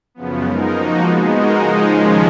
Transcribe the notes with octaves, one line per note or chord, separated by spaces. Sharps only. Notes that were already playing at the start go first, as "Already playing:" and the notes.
F#2 C#3 F3 B3
G#3 D#4 A#4
F3 A#3 D#4 F#4
F3 G#3 B3
G#3 D#4 F#4 A#4 D#5
C#3 F3 G#3 D#4
D#2 C#3 F3 G#3 C#4